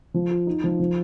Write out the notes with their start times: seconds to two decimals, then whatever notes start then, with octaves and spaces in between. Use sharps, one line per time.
0.14 F3
0.31 F4
0.47 D#4
0.64 F3
0.80 F3